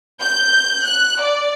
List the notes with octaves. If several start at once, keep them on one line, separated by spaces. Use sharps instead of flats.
G6
F#6
D5